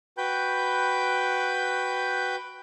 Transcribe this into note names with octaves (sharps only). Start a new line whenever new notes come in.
F#4 B4 G5 B5 G6